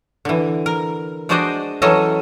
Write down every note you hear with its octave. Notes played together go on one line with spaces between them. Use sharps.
D3 E3
A#4
G#3 D4 F#4 C5 D5 D#5
E3 F#3 C#4 A4 D#5